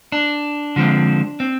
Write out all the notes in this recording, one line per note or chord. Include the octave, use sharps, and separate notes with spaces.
D4
D3 F3 G#3 C4
C4